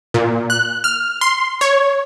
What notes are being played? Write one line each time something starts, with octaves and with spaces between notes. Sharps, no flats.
A#2
F#6
F6
C6
C#5